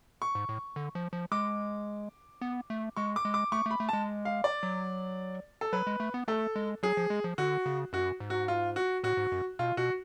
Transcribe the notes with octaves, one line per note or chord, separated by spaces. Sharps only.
C#6
G#2
A2
D3
F3
F3
G#3 D6
B3
A3
G#3 C#6
D6
G#3
D6
A3 C#6
A3
B5
A3
G#3 A5
F5
D5
F#3
A4
F#3 B4
G#3
A3
B3
A3 A4
G#3
F#3 G#4
F3
G#3
F3
D3 F#4
C#3
F#2 F#4
G#2
F#4
F4
F#4
A2 F#4
G#2
F#2
B2 F4
B2 F#4